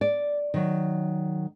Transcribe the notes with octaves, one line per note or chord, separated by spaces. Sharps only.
D5
D#3 F#3